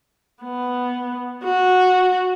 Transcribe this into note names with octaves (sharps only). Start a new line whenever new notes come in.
B3
F#4